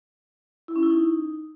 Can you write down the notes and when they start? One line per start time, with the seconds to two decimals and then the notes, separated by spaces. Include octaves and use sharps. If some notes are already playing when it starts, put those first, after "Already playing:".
0.68 E4
0.76 C#4
0.83 E4
0.90 D#4